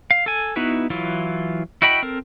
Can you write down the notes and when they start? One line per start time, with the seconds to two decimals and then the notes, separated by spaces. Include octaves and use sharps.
0.11 F5
0.26 A4 G#5
0.56 B3 D#4 E4 F#4 B4
0.90 E3 F#3 E4 F4
1.82 E4 F#4 D#5 G5 B5
2.02 C4 A4 A#4